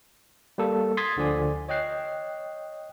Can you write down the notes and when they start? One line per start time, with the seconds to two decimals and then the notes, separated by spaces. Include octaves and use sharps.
0.58 G3 A#3 A4
0.97 C6 D#6 G#6 A6 B6 C7
1.16 D2 D3 F3 D5 G#5
1.69 C#5 D#5 G5 F#6 C7